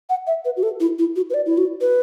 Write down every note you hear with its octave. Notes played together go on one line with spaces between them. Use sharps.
F#5
E5
B4
F#4
A4
E4
E4
F#4
B4
D5
E4
F#4
B4